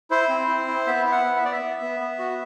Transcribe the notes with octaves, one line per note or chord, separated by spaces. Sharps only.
E4 C5
C4
E4
E4
B3 E5
E4 E5
F#5
B3
E5
B3 D5
E5
B3
B3
B3
F#4